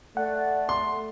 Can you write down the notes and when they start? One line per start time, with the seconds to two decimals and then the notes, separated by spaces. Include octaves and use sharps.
0.17 A3 D5 F#5
0.69 C6